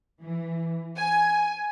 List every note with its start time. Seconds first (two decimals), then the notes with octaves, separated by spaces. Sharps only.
0.21 E3
0.96 G#5